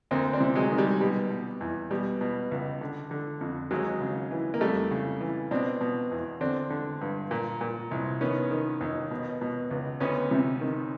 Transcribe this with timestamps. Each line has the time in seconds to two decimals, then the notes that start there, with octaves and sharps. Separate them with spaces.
0.11 D2 A#3 C4
0.33 C4 D4
0.40 C3
0.55 F#3 G#3
0.71 D#3
0.78 G3
1.01 B2 G3
1.30 B2
1.61 E2
1.91 B2 G3
2.21 B2
2.51 C#2
2.81 D3
3.11 D3
3.41 F2
3.71 D#2 F#3 G#3
4.01 C#3
4.31 E3
4.54 A#3
4.60 F2 G3 A3
4.91 C#3
5.20 E3
5.51 B2 C4 D4
5.81 B2
6.11 E2
6.41 D3 C4 D4
6.70 D3
7.01 G2
7.31 A#2
7.61 A#2
7.91 C2
8.21 D#3 B3 C#4
8.51 D#3
8.81 D#2
9.11 B2
9.41 B2
9.71 C#2
10.00 D2 B3 C#4
10.31 C3
10.61 D#3